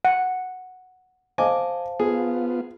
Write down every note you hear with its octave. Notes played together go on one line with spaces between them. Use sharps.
F#5
C5 D#5 F5 G#5 A5 D6
B3 F4 G#4